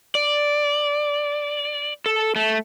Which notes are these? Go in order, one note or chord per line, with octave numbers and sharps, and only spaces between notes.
D5
A4
A3